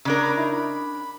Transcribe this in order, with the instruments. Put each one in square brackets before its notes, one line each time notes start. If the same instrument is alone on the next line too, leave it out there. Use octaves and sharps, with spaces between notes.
[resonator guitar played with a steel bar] C#3 D4 A#4
[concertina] A#5 B5 D6
D#4 E4
B5